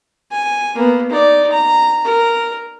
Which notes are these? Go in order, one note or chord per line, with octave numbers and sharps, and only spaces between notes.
G#5
A#3 B3
D#4 D5
A#5
A#4